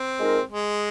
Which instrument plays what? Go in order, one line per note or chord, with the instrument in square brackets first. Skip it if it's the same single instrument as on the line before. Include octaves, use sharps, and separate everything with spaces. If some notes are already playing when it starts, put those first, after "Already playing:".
Already playing: [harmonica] C4
[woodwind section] A#2 G#3 D#4 A#4
[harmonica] G#3